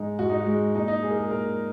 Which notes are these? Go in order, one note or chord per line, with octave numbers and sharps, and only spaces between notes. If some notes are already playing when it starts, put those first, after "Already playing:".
Already playing: G#2 G#3 D#4
G#2 F#4
D#4
F#4
G#3
A#2 D#4
D#4
G#3 G#4
A#4
G#4
A#2 A#4